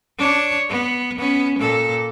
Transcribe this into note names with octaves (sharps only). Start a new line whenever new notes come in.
D4 C#5
B3
B3 C#4
A#2 A4